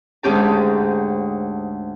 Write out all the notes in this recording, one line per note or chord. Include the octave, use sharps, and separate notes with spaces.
D2 G#2 C#4 G4 A5